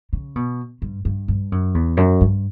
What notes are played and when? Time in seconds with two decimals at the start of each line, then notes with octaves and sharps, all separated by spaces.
0.13 C#3
0.36 B2
0.82 G2
1.05 G2
1.28 G2
1.52 F#2
1.74 E2
1.97 F#2
2.21 G2